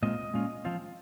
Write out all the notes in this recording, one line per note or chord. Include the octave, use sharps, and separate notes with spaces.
A#2 G#3 C4 F4 D#5
A#2 G#3 C#4 F4
F3 C4 F4